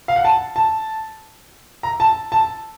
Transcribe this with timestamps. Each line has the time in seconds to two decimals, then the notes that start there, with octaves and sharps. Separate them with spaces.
0.08 F5
0.16 F#5
0.25 A5
0.56 A5
1.83 A#5
2.00 A5
2.32 A5